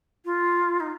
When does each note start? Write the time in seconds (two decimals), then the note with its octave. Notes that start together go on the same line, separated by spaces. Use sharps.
0.25 F4
0.80 D#4